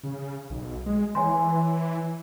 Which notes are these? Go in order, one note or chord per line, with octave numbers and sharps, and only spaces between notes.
C#3
B1
G#3
E3 C#5 G#5 C6